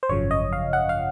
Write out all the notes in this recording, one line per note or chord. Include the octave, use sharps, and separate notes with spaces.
C5
G#1 F#2 C#3 F3 C#5
D#5
F5
F#5
F5